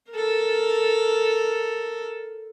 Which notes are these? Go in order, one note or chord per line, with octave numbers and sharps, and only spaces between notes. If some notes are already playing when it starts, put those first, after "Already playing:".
A4 A#4